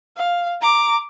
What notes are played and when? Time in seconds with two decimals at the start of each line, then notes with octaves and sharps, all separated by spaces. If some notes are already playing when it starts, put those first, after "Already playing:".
0.17 F5
0.61 A#5 D6